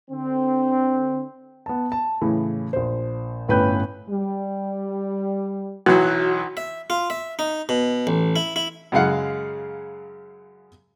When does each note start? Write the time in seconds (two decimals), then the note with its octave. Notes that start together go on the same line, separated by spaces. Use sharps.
0.10 D3 C4
1.66 B3 A5
1.92 A5
2.21 A2 C#3 E3
2.73 A#1 C5
3.48 G1 A2 C#4 B4 G5 G6
4.10 G3
5.86 B1 E3 F#3 F#4
6.57 E5
6.90 F4
7.10 E5
7.39 D#4
7.69 B2
8.07 A1
8.36 E4
8.56 E4
8.92 F#2 C#3 G#3 F5 F#5